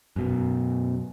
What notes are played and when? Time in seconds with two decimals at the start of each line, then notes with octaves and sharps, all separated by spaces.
0.16 F#2 B2